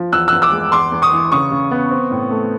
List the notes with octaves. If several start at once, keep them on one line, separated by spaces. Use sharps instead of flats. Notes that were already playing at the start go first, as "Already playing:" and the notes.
Already playing: F3
E2 E6 F#6
E2 E6 F#6
D6 E6
G#3
E2 C6 D6
E2
C#6 D#6
E3
C#3 C#6 D#6
C#3
B3
C4
A2
A3